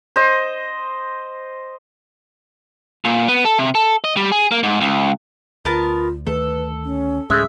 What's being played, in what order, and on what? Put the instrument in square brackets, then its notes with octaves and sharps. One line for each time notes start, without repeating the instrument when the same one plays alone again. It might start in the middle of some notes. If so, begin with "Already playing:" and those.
[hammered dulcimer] C5 D#5
[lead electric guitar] A#2
B3
A4
C3
A4
D#5
G3
G#4
A#3
G#2
C#2
[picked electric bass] D2 [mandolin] B3 A#4 A5 [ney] F4
[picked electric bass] D2 D#3 A3 [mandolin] A4 [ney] B4
[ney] C#4
[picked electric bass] D2 A2 C#4 [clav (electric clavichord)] G#3 A3 [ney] G#4 [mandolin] E5